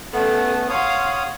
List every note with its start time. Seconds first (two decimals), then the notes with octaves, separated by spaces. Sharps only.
0.13 A3 B3 C#4 A4
0.70 C#5 F5 F#5 C6 D#6